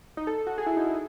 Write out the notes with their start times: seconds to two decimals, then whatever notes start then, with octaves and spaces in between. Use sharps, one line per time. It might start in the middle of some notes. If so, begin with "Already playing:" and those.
0.17 D#4
0.27 A4
0.38 A4
0.47 F#4
0.58 G#4
0.66 E4
0.77 D#4
0.87 E4